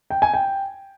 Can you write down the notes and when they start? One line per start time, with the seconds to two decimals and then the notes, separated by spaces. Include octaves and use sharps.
0.10 G5
0.22 G#5
0.34 G5